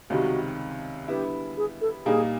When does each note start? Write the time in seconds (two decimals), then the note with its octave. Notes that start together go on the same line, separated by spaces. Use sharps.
0.10 C#2 C3 D#3 G3 F#4
1.08 D3 G3 B3 E4 G4
1.57 G#4
1.81 A4
2.06 A#2 G3 A#3 D#4 G#4